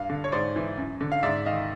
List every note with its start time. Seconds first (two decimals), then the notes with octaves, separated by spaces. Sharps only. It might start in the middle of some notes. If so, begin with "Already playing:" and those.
Already playing: G2 F5
0.10 D3
0.24 C#5
0.32 G#2 C5 D5
0.56 E3
0.78 F#2
1.01 D3
1.12 F5
1.23 G#2 D5 E5
1.46 D#3 D#5 F5